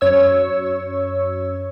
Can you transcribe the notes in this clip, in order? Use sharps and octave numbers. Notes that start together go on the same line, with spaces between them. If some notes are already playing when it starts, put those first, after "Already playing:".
F#2 C#5 C#6 E6